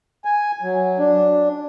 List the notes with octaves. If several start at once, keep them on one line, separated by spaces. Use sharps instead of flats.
G#5
F#3
D4